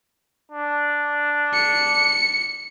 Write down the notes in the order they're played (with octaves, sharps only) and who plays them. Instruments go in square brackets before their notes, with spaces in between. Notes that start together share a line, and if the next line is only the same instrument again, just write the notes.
[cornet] D4
[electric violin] C#7